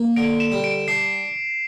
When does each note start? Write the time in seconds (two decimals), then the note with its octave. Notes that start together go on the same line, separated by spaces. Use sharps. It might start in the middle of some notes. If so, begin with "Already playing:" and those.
Already playing: A#3
0.16 D3 D7
0.40 E7
0.52 G3
0.64 D7
0.88 D4 C7